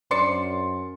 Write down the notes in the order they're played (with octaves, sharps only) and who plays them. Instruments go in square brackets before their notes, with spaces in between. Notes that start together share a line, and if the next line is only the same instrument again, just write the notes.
[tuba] F#2 [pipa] D4 C5 D5 [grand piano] C6 C#7